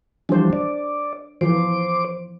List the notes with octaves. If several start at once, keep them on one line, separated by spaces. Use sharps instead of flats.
E3 F3 G3 D4 C5
D5
E3 F3 C5 D6